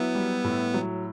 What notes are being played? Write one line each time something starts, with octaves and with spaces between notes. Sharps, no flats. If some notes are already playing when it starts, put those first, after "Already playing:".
Already playing: F#3 B3 E4
G3
A2
F#3